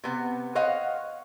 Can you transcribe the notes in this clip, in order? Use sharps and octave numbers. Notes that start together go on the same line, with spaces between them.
C3 B3
C5 C#5 D#5 F5 F#5